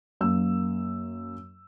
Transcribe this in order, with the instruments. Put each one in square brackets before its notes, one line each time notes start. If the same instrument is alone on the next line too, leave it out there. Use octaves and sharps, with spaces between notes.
[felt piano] F#2 A#3 E6